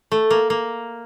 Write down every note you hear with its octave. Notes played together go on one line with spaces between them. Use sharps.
A3
A#3
A#3